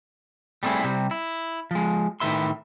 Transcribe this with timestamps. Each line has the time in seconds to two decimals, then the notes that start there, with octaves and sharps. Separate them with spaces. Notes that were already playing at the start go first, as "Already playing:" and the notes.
0.63 G3 A3 B3 C4 E4 G#4
0.84 C3 G3 C4
1.11 E4
1.71 F3 G#3
2.20 A2 D#3 B4 E5 C6